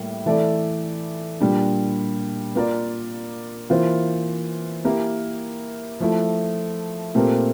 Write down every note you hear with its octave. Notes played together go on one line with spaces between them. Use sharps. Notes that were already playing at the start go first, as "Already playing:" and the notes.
Already playing: A2 G3 A#3 E4
E3 A3 E4 A4 D5
A#2 G3 D4
A#3 F4 A#4 D5
E3 A#3 F4 C5
A#3 E4 G4 A#4
F3 A3 E4
A#2 A3 C4 G4 A#4